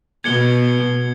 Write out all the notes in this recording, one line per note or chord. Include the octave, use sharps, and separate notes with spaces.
B2 G#6 C#7 G7